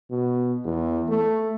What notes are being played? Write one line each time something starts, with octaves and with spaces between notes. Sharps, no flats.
B2
E2
A3